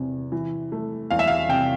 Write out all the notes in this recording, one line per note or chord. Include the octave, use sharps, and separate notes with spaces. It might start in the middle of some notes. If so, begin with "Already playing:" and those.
Already playing: E2 C3
E3
A3
E2 F5
E5
F5
C3 G5